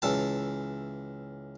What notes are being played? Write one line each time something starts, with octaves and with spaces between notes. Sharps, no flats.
C#2 E3 A5